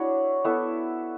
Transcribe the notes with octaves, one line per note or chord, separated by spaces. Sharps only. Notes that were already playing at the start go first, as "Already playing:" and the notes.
Already playing: D4 E4 F#4 C#5 E5
B3 E4 A4 E5